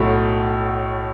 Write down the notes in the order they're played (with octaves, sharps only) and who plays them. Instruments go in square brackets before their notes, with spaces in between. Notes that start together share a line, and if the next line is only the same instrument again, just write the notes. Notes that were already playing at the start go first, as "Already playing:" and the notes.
Already playing: [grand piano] B1 A2 F#3 A3